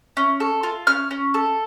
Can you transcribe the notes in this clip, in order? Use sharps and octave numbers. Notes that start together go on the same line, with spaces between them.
C#4
A4
F4
C#4 F6
C#4
A4